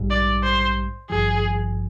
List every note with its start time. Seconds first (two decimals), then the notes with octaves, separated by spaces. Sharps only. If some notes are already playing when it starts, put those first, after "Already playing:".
Already playing: A#1 G#2 G3
0.11 D5
0.43 C5
1.10 G#1 G2 F3 G#4